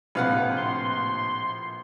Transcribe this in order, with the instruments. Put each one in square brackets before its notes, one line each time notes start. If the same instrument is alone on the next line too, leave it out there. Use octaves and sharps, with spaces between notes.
[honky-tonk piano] A#1 [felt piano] A2 C3 C4 [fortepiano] B4 F5 F#5
[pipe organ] C6